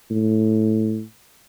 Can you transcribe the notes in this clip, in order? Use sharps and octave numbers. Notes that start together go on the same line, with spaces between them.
A2